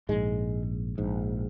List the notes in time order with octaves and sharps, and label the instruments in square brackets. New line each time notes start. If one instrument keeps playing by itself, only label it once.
[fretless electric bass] A#1 G#2 G#3
A#1 G#2